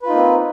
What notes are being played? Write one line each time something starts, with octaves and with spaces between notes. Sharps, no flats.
A#3 C4 D#4 F4 B4